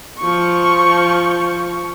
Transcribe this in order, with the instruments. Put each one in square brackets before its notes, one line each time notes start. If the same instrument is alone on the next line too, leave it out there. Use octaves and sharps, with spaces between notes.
[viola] F3 C#6